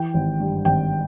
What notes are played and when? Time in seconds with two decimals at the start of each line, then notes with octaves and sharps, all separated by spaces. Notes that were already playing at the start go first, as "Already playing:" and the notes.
Already playing: E3 G5
0.14 G#1
0.40 G2
0.65 G#1 G5